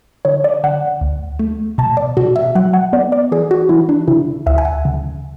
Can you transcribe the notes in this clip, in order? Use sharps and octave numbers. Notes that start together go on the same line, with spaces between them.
D3 C#5
D5
D3 F#5
D2
A3
B2 A5
D5
B2 F#4
E5
F#3 F#5
F#5
B3 D5
D5
E3 G#4
F#4
E3 E4
D4
C#3 E4
D2 E5
G#5
F#5
C#3